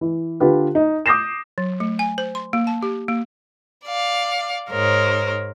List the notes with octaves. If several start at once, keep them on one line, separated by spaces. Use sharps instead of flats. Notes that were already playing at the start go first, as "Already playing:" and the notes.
E3
D3 F4 G4 B4
D#4
D6 D#6 G6 A#6 C7 E7
F#3
A3
G#5
C5
C6
A#3
A5
G4
A#3
D5 F5
G#2 A#4 C5 C#5